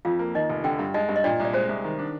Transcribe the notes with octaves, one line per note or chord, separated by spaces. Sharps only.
F2 F4 F5
A#3
D#3 D#4 D#5
F1
D3 G4 G5
G2
G#3 D#4 D#5
G2
D#5
A#2 D4 D5
C2
D5
G#3 C5
C2
D#3
D4